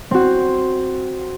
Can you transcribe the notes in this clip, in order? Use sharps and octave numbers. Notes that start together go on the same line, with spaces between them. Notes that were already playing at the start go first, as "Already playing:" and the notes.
C4 F#4